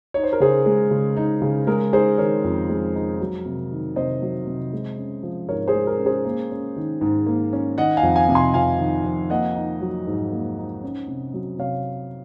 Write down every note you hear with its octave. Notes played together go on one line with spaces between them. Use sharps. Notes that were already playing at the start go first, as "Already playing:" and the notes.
D#4 C#5
C5
A#4
C#3 G#4 C5
G#3
C#3
D#4
C#3
G#3 A#4
D#4 G#4 C5
D#3 A#4 C#5
F2
G#3
D#4
F#3
C3
D#3
C3 C5 D#5
F#3
C3
G#3
C#4
F3
G#2 A#4 C#5
G#4 C5
G#3
A#4
C#4
G#4 C5
A#3
C#4
D#3
G#2
A#3
C#4
D#3 D#5 F#5
F5 G#5
F2
F5 G#5
C3
G#5 C6
F2 F5 G#5
D#3
F2
A#3 D#5 F#5
D#4
F#3
G#2
A#3
D#4
C#4
C3
F#3
C3 C#5 F5